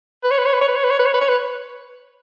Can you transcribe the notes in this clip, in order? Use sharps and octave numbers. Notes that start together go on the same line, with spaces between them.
B4
C#5
B4
C#5
B4
C#5
B4
C#5
B4
C#5
B4
C#5
B4
C#5
B4